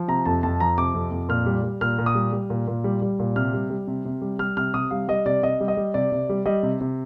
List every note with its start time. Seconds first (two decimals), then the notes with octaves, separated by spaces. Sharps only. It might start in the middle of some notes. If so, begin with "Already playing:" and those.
Already playing: F3
0.08 C3 A#5
0.25 F2 A5
0.43 F2 A5
0.60 F3 A#5
0.78 C3 D6
0.94 F2
1.12 F2
1.29 A#2 F6
1.46 G3
1.63 G3
1.81 A#2 F6
1.99 A#2
2.06 D#6
2.15 G3
2.33 G3
2.50 A#2
2.67 A#2
2.84 G3
3.02 G3
3.19 A#2
3.36 C3 F6
3.53 G3
3.70 G3
3.87 C3
4.05 C3
4.22 G3
4.39 G3 F6
4.57 C3 F6
4.74 C3 D#6
4.91 G3 F5
5.08 G3 D#5
5.26 C3 D5
5.43 C3 D#5
5.61 G3
5.68 D#5
5.77 G3
5.94 C3 D5
6.12 C3
6.29 G3
6.46 G3 D#5
6.63 C3
6.81 C3